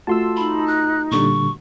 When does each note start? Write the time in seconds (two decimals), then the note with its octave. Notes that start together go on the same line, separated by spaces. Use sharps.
0.07 A3 F4 F#4 A5 C6 E6
0.37 D#4 B5
0.67 F#6
1.11 A#2 D3 G3 C#6